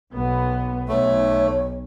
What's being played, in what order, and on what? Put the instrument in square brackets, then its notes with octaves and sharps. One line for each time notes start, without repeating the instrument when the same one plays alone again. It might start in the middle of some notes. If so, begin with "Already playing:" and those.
[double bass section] B1 B3
[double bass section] B1 [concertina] A3 [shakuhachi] C#5